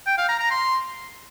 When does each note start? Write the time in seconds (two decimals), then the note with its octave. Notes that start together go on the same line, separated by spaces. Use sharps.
0.07 G5
0.18 F5
0.29 A#5
0.40 A#5
0.51 C6